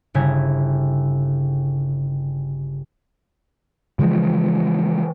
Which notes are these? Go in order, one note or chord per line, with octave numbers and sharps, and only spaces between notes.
G1 C#3 E4 A#5 G#6
C#3 E3 F3 G#3